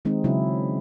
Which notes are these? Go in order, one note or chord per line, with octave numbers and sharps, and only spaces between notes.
D#3 G#3 C4 D#4
C#3 F#3 C#4 E4